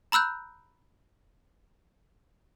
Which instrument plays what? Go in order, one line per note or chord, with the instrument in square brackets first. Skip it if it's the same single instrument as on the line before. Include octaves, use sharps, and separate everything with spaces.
[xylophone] A#5 B5 E6 F#6 G6